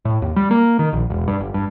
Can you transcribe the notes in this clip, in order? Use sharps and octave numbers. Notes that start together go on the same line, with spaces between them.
A2
D#2
G3
A#3
D#3
A#1
E1
G2
G1
G2